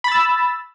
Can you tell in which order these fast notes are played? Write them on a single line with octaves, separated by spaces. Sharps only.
B5 A6 E6